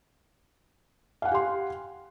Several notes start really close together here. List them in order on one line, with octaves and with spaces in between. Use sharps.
F5 F#5 G#5 G4 C6